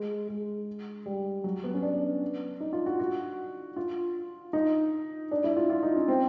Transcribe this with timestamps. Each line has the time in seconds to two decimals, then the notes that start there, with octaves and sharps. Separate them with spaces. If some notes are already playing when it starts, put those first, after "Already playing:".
Already playing: G#3
0.28 G#3
1.06 G3
1.44 F#3
1.64 B3
1.74 C#4
1.83 D4
2.60 D#4
2.73 F4
2.86 F#4
3.00 F#4
3.76 F4
4.53 D#4
5.31 D4
5.44 E4
5.57 F4
5.70 F4
5.83 D#4
5.96 C#4
6.08 C4